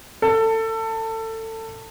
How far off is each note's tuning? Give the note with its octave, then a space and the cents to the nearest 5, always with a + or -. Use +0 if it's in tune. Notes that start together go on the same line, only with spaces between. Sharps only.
A4 +25